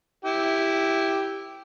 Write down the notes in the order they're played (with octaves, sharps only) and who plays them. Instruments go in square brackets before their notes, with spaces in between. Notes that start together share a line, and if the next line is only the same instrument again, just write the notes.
[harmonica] E4 G4